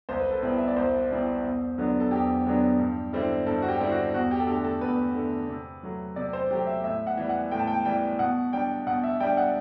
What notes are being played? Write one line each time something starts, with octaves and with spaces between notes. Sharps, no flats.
C2 C5
B4
A4
B2 G3 C4 E4 B4
E5
D5
C2 C5
B2 G3 C4 E4
E2
D3 F#3 B3 D4
A4
E2 G4
D3 F#3 B3 D4
G2
D3 G3 C4 E4
G2 A4
F#4
G4
D3 G3 C4 E4
F#4
E2 F#4
G4
A4
D3 A3 G4
A4
E2 B4
D3 A3
C3
F#3 A3
C3 D5
C5
F#3 A3 G4
E5
A2 E5
F#5
E3 G3
F#5
A2 G5
A5
G5
E3 G3 G5
B2 F#5
G3 D4 G5
B2 F#5
E5
G3 D4 G5
F#5